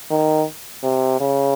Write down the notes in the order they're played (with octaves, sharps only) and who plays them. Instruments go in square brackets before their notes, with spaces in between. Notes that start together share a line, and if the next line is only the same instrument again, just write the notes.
[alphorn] D#3
C3
C#3